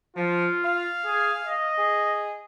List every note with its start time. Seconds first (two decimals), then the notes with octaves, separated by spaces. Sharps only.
0.17 F3 F4
0.65 F5
1.06 G#4
1.45 D#5
1.79 G#4